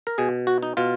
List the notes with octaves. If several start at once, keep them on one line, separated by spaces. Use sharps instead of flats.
A#4
B2 G#4
F#4
D#4
B2 F4